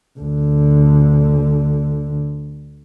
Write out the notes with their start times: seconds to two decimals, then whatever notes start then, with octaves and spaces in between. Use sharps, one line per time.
0.19 D2 D3